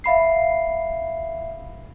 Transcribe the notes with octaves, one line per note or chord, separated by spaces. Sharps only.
E5 F5 B5 C7